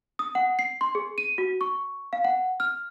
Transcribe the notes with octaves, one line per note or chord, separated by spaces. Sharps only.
D#6
F#5
C7
C6
G#4
D#7
F#4
C#6
F5
F#5
F6